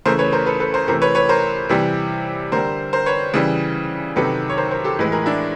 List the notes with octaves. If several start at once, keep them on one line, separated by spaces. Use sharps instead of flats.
C#3 E3 A3 A#4 C5
B4 C#5
A#4 C5
A4 B4
A4 B4
A#4 C5
C3 E3 A3 A#4 C5
B4 C#5
B4 C#5
A#4 C5
C3 E3 G3
D3 G3 A#4 C5
A#4 C5
B4 C#5
C#3 E3 G3
C3 D#3 F#3 A4 B4
C#5
A#4 C5
A#4 C5
G4 A4
A2 E3 G#3 B4
G#4 A#4
D4 E4